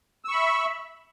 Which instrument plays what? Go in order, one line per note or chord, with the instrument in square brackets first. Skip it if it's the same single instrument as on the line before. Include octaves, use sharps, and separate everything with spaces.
[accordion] E6
C#6
B5
E5